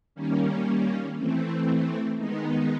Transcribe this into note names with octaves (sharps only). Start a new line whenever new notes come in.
D#3 G3 A#3 C#4
E3 A3 C4
D#3 G#3 B3 D#4